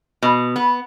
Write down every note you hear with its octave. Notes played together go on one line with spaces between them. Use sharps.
B2
B3